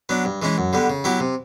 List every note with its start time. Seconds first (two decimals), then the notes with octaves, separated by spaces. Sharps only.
0.09 F#3 B3 D4
0.25 G2
0.42 E3 G#3 C#4 E4
0.58 F#2
0.73 D3 G3 B3
0.90 C#3
1.04 F#3 B3 E4 G4
1.20 C3